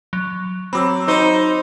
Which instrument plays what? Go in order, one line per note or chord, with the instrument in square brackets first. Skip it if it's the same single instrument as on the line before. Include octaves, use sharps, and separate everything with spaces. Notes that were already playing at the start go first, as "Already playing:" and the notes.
[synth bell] F#3
[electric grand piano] F#3 C4 [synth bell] B5 D6 E6
[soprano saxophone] D#4 [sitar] C5